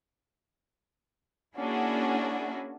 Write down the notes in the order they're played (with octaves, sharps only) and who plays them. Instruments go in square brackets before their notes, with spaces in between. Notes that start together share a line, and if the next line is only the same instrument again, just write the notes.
[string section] A#3 C#4 D4 E4 F#4 G#4